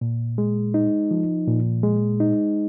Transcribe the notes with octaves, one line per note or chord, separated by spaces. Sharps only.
A#2
G#3
D#4
F3
A#2
G#3
D#4